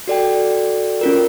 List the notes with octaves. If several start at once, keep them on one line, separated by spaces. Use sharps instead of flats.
F#4 A4 D5 G5
C#4 F4 A#4